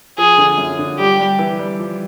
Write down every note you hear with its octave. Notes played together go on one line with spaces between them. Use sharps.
F3 G#4
D3
F#2
D3
G3 G4
G3
E3
G3
F3